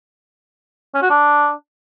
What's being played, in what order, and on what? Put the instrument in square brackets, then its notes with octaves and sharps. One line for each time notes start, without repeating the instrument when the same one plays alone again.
[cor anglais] C#4
F#4
D4